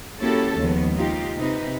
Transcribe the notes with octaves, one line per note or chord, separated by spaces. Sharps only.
A#3 C#4 E4 F#4 G4 A4
D#2 C#3 F3 G#3 B3
D#4 F4 G4
C3 D#4 B4